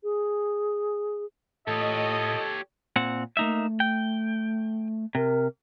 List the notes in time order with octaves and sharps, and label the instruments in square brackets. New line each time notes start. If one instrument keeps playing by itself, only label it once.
[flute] G#4
[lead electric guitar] A2 [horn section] F4 D#5 [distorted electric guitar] G4 C#5 [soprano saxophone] A4
[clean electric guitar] A#2 C4 F#5
[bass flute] A3 [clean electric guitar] A#3 D#4 E5
[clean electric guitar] G5
[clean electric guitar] C3 [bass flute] A#4